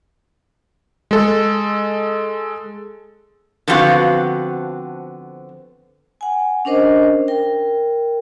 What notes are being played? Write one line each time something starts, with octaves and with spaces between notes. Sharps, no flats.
G#3 A4
D3 F3 B3 C4 F#4 F5
F#5 G#5
C#4 D4 A#4 C5 D#5
A#4 G5